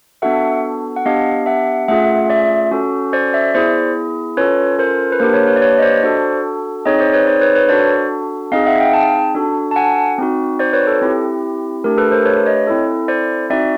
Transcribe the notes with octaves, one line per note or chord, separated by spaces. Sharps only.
B3 D4 F#4 A4 E5 F#5
F#5
B3 D4 G4 D#5 F5
E5 F#5
A3 C#4 F4 G#4 E5 F#5
D5 E5
C#4 F#4 A4
C5 D5
D5 E5
B3 E4 G#4 C5 D5
C#4 F4 A4 B4 C#5
A#4 C5
B4
A#3 D4 G4 A#4 C5
B4 C#5
B4 C#5
D5
B4 C#5
D#5
C5 D5
D4 F#4 A4 C5 D5
C4 D#4 G#4 C#5 D#5
C5 D5
B4 C#5
C5 D5
B4 C#5
B4 C#5
D4 F#4 A4 C5 D5
C4 D#4 G#4 D#5 F5
E5 F#5
F5 G5
G5 A5
D4 F#4 A4
A5
F#5 G#5
C4 D#4 F#4
C5 D5
B4 C#5
A4
C4 E4 G4
A3 D4 G4 A#4
A4 B4
A#4 C5
B4 C#5
C#5 D#5
C4 E4 A4
C5 D5
C4 D#4 F#4 D5 E5